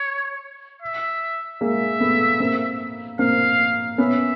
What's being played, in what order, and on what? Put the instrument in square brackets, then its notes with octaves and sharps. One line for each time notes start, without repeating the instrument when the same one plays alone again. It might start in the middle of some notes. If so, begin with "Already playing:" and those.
Already playing: [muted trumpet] C#5
E5
[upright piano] G#3 A#3 [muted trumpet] E5
[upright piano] A3 B3
A#3 C4
[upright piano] A#3 C4 [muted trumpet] F5
[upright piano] B3 C#4 [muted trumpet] E5